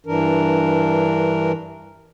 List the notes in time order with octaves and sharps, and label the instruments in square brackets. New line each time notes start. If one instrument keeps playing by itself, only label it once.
[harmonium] G2 E3 D4 A#4